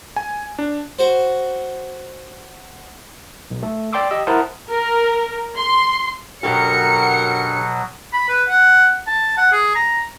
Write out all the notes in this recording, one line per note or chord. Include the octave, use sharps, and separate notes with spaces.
G#5
D4
F#4 C5
B1
A3 A4
D5 G5 C6 D6 E6
G4 D#5 E6
E4 A#4 C5 F#5 A5 D#6
A#4
C6
F#2 B2 D3 F#3 F#4 G4 A#4 C#7
B5
B4
F#5
A5
F#5
G#4
A#5